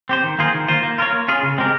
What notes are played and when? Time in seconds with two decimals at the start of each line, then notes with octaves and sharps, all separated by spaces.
0.09 C4 G4 C5
0.24 D#3
0.39 A#3 F4 G#4 C5
0.54 D#3
0.68 A#3 F4 C5
0.83 A#3
0.98 F4 A#4 C#5
1.13 A#3
1.28 C#4 F4 G#4
1.43 C#3
1.58 G#3 C4 G4 A#4